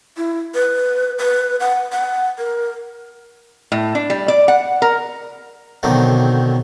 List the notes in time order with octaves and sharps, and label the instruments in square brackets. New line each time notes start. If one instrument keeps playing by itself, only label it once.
[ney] E4
B4
B4
F#5
F#5
A#4
[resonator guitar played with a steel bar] A2
D4
G3
D5
F#5
A#4
[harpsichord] B1 D3 D#3 F#3 C4